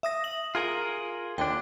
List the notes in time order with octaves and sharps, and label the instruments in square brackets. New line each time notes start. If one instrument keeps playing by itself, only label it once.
[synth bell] E5 D#6 A#6
F#7
[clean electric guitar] F4 G#4 A#4
[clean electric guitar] D#2 D3 D4 [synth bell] G5